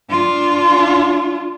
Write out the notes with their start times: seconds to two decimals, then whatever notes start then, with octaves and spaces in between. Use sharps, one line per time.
0.10 D4 F4